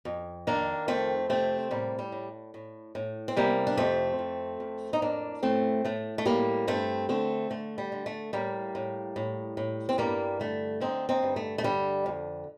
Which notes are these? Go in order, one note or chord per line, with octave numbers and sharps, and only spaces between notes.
F2
D#3 A#3 D4
F2 A3 C4
C3 A3 C4
A2 G3 A#3
G3
A2
A2
A2
C4
C3 G3 A#3
D4
F2 A3 C4
F2
F2
D#4
A2 A#3 D4
A2 A3 C4
A2 A3
A3
A2 G3 A#3
G2 A3 C4
D3 A3 C4
D3 A3
G3
D3
A3
A2 G3 A#3
A2
A2
A2
C4
G2 G3 A#3
D3 A3
D3 C4 D#4
C4 D#4
G2
A3
A3
D3 G3
F2